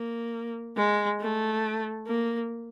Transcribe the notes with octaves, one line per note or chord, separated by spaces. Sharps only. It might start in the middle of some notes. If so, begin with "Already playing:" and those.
Already playing: A#3
G#3
A3
A#3